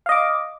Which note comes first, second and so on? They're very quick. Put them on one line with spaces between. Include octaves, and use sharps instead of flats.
F5 D#5 D6